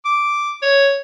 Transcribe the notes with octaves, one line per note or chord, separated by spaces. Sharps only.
D6
C#5